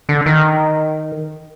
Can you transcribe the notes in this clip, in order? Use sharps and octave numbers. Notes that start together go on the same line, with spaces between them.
D3
D#3